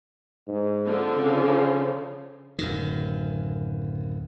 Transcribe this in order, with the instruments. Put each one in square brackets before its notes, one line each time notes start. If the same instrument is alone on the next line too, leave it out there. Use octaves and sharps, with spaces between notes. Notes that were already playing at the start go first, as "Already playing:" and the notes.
[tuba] G#2
[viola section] D3 F3 C4
[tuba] C#3
[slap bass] D1 F#2 D#3